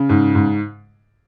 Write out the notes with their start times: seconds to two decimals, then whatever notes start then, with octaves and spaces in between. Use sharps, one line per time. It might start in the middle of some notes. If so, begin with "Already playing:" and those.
Already playing: C#3
0.09 G#2
0.35 G#2